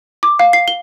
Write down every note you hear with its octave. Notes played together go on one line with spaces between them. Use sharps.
D6
F5
C7
G7